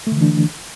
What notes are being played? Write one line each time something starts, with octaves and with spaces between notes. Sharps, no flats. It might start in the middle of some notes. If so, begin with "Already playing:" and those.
D3 E3 A3 D4